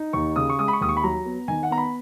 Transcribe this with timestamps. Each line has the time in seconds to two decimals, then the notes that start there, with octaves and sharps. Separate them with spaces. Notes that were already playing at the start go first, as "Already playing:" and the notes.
Already playing: D#4
0.13 D#2 C#6
0.36 C#3 D#6
0.49 C#6
0.59 G#3 D#6
0.68 B5
0.73 C#6
0.81 D#2 D#6
0.89 C#6
0.97 B5
1.03 F#3 A#5
1.26 B3
1.48 D#3 G#5
1.63 F#5
1.70 B3 A#5
1.78 B5